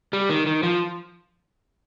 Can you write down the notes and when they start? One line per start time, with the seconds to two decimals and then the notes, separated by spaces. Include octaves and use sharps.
0.13 G3
0.30 D#3
0.46 D#3
0.63 F3